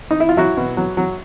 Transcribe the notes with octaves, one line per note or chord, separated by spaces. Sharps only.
D#4
E4
F4
F#3 E4 F#4
B2
F#3
F#3